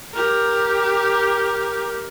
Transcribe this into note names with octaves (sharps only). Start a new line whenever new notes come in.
G4 A#4